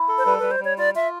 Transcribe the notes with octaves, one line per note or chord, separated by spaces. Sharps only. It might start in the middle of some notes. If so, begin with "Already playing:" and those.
Already playing: E4
A4
C5
G3 B4
G3 B4
C5
G3 C#5
F4 D5
F4 E5